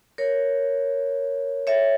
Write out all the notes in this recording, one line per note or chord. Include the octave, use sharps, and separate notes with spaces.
A#4 C#5
C#5 E5